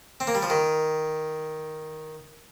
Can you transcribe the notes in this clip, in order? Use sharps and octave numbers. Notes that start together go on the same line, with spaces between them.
C4
A#3
G3
F3
D#3